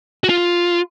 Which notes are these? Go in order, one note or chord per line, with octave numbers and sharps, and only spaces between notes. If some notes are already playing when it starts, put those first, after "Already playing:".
F#4
F4